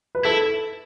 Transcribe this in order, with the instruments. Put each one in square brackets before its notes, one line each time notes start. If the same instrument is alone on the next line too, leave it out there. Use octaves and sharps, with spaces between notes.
[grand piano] B4
[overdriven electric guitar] E4 [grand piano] A4